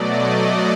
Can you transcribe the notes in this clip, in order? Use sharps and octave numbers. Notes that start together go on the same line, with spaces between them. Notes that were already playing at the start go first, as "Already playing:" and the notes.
Already playing: B2 F#3 A3 D5 D#5